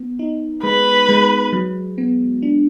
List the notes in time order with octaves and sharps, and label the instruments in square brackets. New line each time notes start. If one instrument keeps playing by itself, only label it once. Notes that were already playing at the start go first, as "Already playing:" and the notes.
Already playing: [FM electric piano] B3
D#4
[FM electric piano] G#3 [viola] B4
[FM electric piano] G#3
F#3
B3
D4